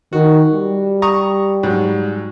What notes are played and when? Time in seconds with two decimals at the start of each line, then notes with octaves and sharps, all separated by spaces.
0.13 D#3 F#4
0.54 G3
1.02 A#5 C#6 D#6
1.63 G#2 F#3